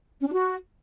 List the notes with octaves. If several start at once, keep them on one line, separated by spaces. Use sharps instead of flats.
C#4
D4
F#4